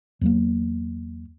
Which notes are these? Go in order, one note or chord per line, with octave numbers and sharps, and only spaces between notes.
E2 F#3 A#3